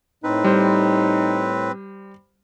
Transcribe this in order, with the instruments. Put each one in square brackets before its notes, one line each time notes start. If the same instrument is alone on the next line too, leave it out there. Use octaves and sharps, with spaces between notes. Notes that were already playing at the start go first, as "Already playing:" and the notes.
[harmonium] A2 [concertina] C4 B4 [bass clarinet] D#4
[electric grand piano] G3 C5